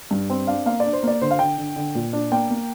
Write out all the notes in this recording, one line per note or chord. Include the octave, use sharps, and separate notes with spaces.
G2
C4
D4 F5
A#3 F5
D4 D5
C5
A#3 D5
D3 C5
F5
D3 G5
D3
D3
A#2
D4
A#3 G5
A#3